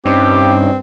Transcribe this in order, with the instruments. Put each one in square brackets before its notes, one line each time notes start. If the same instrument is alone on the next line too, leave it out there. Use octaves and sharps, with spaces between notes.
[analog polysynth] G2 [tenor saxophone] C4 [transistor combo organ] C#4 D#4 [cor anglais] G4